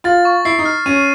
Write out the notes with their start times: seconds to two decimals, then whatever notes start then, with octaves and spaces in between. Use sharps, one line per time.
0.04 F4 A6
0.25 C#6
0.45 E4 C7
0.59 D#4
0.65 F6
0.86 C#4 D#7